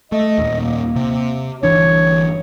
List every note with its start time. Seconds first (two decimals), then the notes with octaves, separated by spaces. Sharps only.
0.12 A3 D#5
0.38 D#2 A#2
0.60 A#3
0.96 C3
1.63 G1 E3 D4 C#5